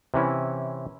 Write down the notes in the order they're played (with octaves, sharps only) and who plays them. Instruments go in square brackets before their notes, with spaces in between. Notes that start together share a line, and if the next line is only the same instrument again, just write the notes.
[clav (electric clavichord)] C3 E3 C#4 E4